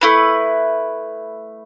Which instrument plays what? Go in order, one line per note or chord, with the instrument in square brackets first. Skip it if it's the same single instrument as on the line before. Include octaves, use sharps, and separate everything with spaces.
[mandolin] A3 E4 B4